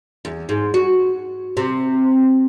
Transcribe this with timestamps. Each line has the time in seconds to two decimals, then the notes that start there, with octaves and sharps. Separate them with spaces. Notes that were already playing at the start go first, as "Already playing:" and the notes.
0.25 E2
0.49 G#2
0.74 F#4
1.57 C3